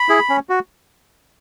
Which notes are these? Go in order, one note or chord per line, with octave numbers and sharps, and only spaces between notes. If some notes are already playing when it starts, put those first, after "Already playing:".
Already playing: B5
E4 G#4
C#4
F#4